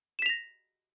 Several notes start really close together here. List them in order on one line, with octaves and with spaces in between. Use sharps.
E7 B6 F7 A#6